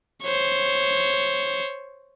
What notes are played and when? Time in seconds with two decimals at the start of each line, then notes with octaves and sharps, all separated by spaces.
0.22 C5 C#5